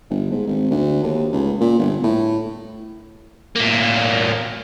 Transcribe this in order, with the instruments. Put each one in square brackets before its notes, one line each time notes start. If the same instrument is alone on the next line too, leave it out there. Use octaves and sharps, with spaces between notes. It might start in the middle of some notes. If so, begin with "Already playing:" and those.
[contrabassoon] G1
G#2
G#1
D2
D#2
C#2
A#2
G1
A2
[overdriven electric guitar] A2 A#3